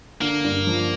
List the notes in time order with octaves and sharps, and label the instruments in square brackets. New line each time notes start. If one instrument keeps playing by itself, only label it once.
[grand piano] D3 [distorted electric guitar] A#3
[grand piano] G2
F3